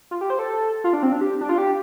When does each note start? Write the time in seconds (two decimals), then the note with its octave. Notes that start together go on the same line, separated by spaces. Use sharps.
0.11 F4
0.21 G4
0.30 C5
0.39 A4
0.84 F4
0.93 D4
1.03 C4
1.12 D4
1.21 G4
1.41 D4
1.49 F4
1.58 G4